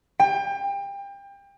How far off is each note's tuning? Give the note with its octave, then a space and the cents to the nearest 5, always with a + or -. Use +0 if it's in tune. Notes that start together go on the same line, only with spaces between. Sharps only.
G5 +30